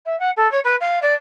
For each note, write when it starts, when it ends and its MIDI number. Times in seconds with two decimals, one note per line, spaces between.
0.05 0.18 76
0.19 0.30 78
0.36 0.50 69
0.51 0.59 73
0.64 0.75 71
0.80 0.99 77
1.02 1.14 74